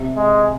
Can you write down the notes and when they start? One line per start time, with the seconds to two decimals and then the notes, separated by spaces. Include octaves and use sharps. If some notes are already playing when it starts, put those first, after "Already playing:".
Already playing: C3
0.15 G#3